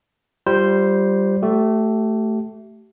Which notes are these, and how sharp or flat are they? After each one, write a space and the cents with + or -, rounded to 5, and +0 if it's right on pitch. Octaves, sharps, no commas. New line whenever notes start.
G3 -10 F4 -20 C5 +0
A3 +0 G4 -35